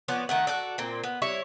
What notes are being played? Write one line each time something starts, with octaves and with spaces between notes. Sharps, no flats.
F3 B3 C#5 D5
D#3 A3 F#5
F#4 A4 D5
A#2 C4
B3
G3 E4 C#5